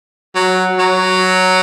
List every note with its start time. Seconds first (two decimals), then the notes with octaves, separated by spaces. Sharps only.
0.35 F#3
0.78 F#3